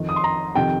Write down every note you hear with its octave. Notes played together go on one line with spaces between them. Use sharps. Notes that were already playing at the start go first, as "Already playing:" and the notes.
Already playing: F2 D#3
D#6
C6
A#5
F2 C3 D#3 G5